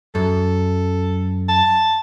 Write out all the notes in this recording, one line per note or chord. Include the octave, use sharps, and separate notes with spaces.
F#2 A4
A5